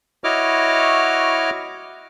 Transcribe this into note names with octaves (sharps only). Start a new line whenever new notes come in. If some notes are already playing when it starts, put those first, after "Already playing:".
E4 F#4 C#5 D#5 D6 F6